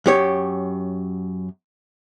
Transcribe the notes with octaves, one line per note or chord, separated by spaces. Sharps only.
F#2 G4 C#5